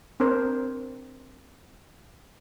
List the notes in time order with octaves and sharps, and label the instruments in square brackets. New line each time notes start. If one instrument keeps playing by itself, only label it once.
[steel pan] C4 D4 A#4 C5